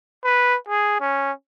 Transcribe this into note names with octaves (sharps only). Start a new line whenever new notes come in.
B4
G#4
C#4